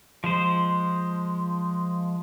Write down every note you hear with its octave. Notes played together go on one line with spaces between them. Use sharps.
F3 G#3 C5